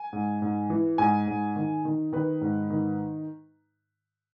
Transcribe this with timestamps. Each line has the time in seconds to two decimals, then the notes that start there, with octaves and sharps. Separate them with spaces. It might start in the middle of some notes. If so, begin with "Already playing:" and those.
Already playing: G#5
0.13 G#2
0.42 G#2
0.70 E3
0.98 G#2 G#5
1.27 G#2
1.56 D#3
1.85 D#3
2.13 D#3 B4
2.41 G#2
2.70 D#3